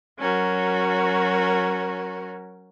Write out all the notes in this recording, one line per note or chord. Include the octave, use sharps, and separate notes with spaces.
F#3 C#4 F#4 A#4